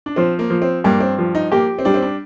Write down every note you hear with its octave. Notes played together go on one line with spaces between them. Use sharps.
D4
F3 C4
A#3
F3
C4
G2 A#3
C4
F3
D#4
A#3 G4
C4
G3 D4
C4
D4